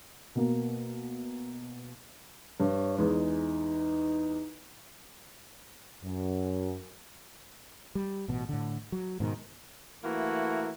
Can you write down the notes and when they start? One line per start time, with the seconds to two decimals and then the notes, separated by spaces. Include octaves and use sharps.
0.35 B2 A#3
2.60 G2 C#5
2.98 E2 G#3 D#4
6.03 F#2
7.95 G3
8.28 A1 B2
8.49 A2 D3
8.92 F#3
9.20 G#2 B2 D#3
10.04 E3 A3 A#3 E4 F#4